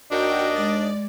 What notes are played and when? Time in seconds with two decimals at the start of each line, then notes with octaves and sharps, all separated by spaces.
0.11 D#2 D4 F#4 A#4 D#5 G5
0.55 G#3 D5